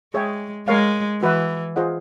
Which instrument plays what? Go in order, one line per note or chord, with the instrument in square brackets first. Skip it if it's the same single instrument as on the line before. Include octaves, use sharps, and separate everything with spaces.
[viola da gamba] G#3 [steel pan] G#4 C#5 E5 G5
[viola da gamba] G#3 [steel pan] A#4 C#5 F5
[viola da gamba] E3 [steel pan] F#4 B4 E5
[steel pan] F4 G#4 C5 D#5 F#5